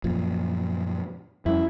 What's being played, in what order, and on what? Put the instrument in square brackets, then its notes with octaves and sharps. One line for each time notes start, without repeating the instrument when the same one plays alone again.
[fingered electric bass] F#2 A#2 F3
[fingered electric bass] F2 G3 C#4 [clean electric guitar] E4